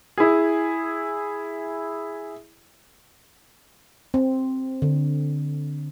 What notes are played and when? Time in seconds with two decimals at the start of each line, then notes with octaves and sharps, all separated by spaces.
0.18 E4 G#4
4.14 C4
4.82 D3